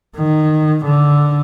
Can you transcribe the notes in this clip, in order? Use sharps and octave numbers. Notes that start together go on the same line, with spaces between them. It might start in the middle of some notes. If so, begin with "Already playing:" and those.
D#3
D3